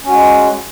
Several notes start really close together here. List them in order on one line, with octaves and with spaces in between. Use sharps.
C#4 F#4 G#3